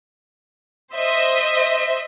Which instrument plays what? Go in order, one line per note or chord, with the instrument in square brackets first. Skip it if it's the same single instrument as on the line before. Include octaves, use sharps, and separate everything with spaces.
[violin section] C5 D#5 E5